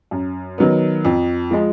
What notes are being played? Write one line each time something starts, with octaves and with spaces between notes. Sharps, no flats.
F#2
D#3 F#3 B3
F2
F3 G#3